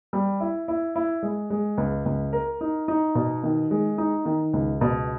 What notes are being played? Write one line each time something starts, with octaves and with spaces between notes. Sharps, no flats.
G3
E4
E4
E4
G#3
G#3
C#2
C#2
A#4
D#4
D#4
B2
D#3
G#3
D#4
D#3
C#2
B2